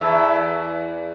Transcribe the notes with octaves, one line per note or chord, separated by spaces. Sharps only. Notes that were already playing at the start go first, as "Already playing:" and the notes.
E2 E4 A4 E5